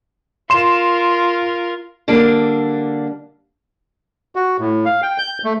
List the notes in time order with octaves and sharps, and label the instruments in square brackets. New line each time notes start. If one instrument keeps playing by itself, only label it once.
[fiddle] F4 A#4 [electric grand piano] C6 E7
[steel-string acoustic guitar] D3 G3 A#3 D4
[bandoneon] F#4
A2
F5
G5
G6
A3